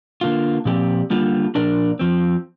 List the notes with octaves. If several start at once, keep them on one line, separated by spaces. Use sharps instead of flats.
D3 A#3 F4
A#2 F3 C4 G4 D5
D3 G3 A#3 F4
A#2 F3 D4 A#4 D5
F2 F3 C4